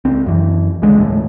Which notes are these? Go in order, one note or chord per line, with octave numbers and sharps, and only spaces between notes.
C#2 C4
F#2 E3
C#2 D3 G#3
E1 D#2 A2